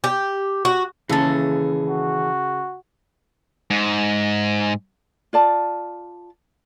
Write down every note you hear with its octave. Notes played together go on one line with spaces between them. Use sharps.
G4
F#4
D#2 C#3 E3 G#4 A4 A5
F#4
G#2
F4 D5 A5